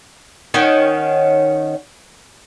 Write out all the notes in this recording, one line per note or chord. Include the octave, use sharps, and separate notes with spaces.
D#3 C#4 C#5 F#5